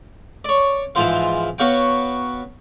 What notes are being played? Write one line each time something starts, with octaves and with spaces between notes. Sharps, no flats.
C#5 D5
G#2 E3 F3 F4 C5 F5
B3 F#4 C#5 F5 G5